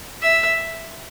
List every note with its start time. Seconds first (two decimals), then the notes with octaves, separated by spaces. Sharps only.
0.22 E5